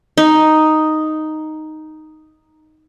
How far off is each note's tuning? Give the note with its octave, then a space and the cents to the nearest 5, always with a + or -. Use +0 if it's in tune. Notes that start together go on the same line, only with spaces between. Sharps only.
D#4 +0